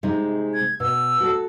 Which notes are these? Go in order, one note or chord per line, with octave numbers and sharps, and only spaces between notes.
C3 G#3 D#4
G#6
B2 E6
F#4 A4